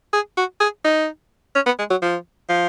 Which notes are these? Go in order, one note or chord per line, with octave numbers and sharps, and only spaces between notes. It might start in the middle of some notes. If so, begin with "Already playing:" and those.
G#4
F#4
G#4
D#4
C#4
B3
G#3
F#3
F3
F3